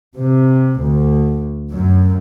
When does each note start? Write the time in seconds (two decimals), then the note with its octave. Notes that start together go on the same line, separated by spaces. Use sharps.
0.17 C3
0.80 D2
1.73 F#2